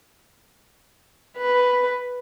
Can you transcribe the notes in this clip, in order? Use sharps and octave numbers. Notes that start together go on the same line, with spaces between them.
B4